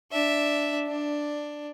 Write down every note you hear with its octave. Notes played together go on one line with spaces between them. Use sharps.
D4 E5
D4